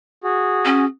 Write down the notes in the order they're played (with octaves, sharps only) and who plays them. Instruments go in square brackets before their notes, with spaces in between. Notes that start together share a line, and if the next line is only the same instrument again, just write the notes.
[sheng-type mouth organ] F#4 G#4
[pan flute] C#4